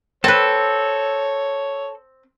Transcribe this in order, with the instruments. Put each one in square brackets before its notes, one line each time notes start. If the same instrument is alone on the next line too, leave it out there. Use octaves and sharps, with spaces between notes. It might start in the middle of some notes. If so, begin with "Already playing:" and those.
[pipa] C4 [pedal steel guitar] A4 [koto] B4 A5 [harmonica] C#5